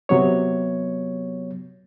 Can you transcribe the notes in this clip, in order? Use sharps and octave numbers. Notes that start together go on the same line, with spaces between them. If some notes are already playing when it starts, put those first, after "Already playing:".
C3 F#3 B3 C#5